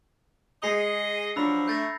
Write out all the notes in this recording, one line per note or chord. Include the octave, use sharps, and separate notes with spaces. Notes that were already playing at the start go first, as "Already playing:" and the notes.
G#3 G#4 D#5 A#6 C7 C#7
F3 F#3 D4 A#5 B5 E6
A3 G6 A6 A#6